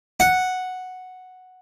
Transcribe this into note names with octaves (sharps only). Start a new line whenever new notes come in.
F#5